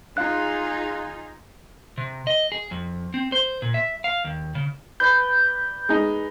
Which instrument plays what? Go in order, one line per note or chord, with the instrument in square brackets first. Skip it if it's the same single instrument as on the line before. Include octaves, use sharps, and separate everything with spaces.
[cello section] D#4 F4 G#4 [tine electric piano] F5 F#6
[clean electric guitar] C3
D#5
G#4
F2
C4
C5
A#2
E5
F5
D#2
C#3
[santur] B4 D5 B5 [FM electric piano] G6
[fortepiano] G#3 D#4 [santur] G#4